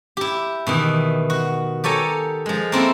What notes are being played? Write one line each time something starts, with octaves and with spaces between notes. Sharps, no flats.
E4 G4
B2 D#3 E3
F#4
G4 A4 C#5 G#5 A#5
F3 G#3
A#3 C4 E4 A4